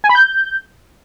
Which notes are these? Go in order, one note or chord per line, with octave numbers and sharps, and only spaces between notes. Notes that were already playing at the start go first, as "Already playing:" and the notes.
G#5
B5
G6